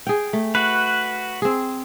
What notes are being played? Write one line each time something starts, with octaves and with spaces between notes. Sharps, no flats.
G#4 G5
A3
F#4 B4
C4 G#4